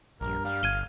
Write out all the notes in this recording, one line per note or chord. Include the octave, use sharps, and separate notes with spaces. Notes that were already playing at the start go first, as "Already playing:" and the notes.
A#1 G2 A#4
G3 F5
G1 G#6 D#7 G7